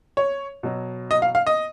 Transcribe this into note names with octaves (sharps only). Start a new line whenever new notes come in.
C#5
B2 F#3
D#5
F5
F5
D#5